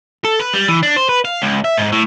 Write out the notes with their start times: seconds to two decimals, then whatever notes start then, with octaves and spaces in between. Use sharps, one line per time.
0.25 A4
0.40 B4
0.53 G3
0.68 E3
0.83 D4
0.96 C5
1.09 B4
1.25 F5
1.42 C#2
1.65 E5
1.77 G#2
1.92 A2